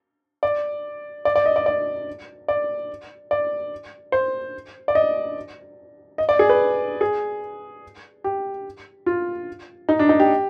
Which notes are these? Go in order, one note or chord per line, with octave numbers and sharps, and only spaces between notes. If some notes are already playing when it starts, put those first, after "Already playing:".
D5
D5
D5
D#5
D5
D5
D5
D5
C5
D5
D#5
D#5
D5
G#4
B4
G#4
G4
F4
D#4
D4
D#4
G4